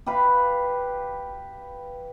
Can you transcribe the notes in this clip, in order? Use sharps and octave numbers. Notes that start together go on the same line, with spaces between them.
G4 B4 F5